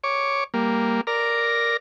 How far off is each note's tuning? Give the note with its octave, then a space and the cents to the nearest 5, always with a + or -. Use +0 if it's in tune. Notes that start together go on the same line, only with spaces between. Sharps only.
C#5 +0 D6 +0
G3 +0 A#3 +0
A#4 +0 D5 +0 A#5 +0